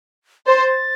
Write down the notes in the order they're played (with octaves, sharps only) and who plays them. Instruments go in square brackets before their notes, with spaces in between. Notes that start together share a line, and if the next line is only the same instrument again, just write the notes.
[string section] C5 [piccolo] A6